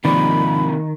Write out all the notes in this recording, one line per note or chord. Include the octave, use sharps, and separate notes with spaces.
G#2 C3 D#3 F3 A#3 D5 B5